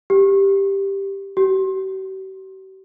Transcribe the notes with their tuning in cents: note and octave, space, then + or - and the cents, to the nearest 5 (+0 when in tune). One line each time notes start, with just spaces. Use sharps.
G4 +5
G4 -45